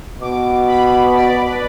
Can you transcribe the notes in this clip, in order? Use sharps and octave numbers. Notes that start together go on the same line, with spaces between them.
B2 D6
B5
D5
B4